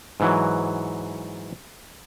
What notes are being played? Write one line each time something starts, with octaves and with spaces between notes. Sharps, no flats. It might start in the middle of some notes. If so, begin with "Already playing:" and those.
G#2 E3 F#3